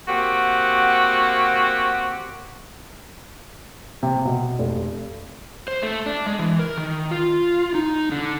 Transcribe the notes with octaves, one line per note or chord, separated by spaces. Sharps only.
A#3 C4 F#4 G4 F#5
C3
B2
F1
C5
A3
D4
G#3
E3
A#4
D#3
F4
D#4
D3